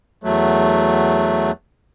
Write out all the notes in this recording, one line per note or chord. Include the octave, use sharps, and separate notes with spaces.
E2 F#3 A3